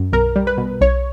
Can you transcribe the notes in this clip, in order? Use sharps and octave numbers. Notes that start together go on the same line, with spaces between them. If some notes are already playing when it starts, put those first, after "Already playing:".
Already playing: F#2
B1 A#4
G3
B4
B2
B1 C#5